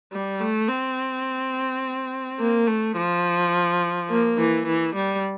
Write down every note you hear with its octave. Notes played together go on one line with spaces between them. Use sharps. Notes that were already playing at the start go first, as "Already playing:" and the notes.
G3
A3
C4
A#3
A3
F3
A#3
E3
E3
G3